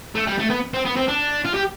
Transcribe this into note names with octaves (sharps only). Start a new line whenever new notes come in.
A3
G3
A3
B3
C4
B3
C4
D4
F4
G4